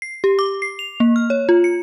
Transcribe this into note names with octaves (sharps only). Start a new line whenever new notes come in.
C7
G4
D6
C7
F7
A#3
F6
C#5
F4
C#7